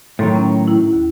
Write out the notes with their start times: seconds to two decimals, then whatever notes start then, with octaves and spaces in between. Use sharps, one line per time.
0.19 A2 D#3 F#3 A4 C6
0.35 C#4
0.68 E4
0.93 D#2